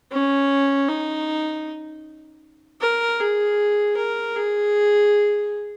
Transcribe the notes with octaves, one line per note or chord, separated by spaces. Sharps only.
C#4
D#4
A#4
G#4
A#4
G#4